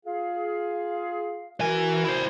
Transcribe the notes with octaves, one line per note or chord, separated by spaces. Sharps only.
F4 G#4 F5
E3 F#4 A#4 G#5
E4 C5